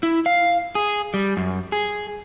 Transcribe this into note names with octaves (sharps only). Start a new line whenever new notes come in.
E4
F5
G#4
G3
F#2
G#4